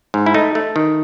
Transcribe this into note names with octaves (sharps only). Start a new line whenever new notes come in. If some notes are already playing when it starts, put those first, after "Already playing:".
G#2
E4
A3 D#4
A3
D#3